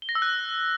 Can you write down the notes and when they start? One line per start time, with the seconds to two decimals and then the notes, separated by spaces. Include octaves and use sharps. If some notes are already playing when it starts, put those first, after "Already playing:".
0.02 G7
0.09 A#6
0.15 E6
0.22 F#6